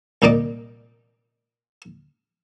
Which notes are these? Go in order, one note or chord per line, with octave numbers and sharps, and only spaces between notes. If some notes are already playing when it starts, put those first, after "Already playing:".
C2 A#2 D#4 D5 D#5 D6